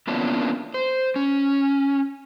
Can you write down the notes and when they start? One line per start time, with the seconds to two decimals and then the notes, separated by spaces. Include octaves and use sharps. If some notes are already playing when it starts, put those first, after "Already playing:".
0.07 A#3 B3 C#4 D4 E4 F4
0.74 C5
1.16 C#4